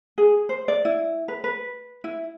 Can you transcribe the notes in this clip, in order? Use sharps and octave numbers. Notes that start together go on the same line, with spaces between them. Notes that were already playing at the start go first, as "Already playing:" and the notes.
G#4
C5
D5
E4
B4
B4
E4